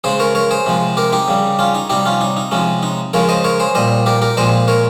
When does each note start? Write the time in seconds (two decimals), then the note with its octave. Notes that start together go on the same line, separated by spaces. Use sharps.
0.04 C#3 G#3 G#4 C5
0.20 A#4 C#5
0.35 A#4 C#5
0.51 G#4 C5
0.66 C3 F3 G#3
0.97 G4 A#4
1.12 D#4 G4
1.28 C#3 G3
1.59 C#4 F4
1.75 D#4
1.90 C3 G3 D#4 G4
2.06 C#4 F4
2.21 D#4
2.37 D#4
2.51 C3 F3 G#3 C#4
2.83 D#4
3.13 C#3 F3 G#3 A#4 C#5
3.29 C5 D#5
3.44 A#4 C#5
3.60 G#4 C5
3.75 A#2 G3 C5 D#5
4.06 G4 A#4
4.22 G4 A#4
4.37 A#2 F3 G#3 C5 D#5
4.68 A#4 C#5